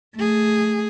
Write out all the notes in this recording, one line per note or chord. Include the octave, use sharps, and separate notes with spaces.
A3 G#4